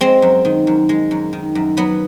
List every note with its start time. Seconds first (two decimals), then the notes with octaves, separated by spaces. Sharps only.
0.01 G#3 C4
0.22 F#2
0.45 D#3
0.67 F#2
0.89 G#3
1.11 F#2
1.33 D#3
1.55 F#2
1.77 F#3 B3